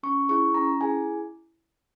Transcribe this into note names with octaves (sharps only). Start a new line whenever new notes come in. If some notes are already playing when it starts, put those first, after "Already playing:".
C#4 C#6
E4 G#4 C#6
C#4 A#5
E4 G#4 G#5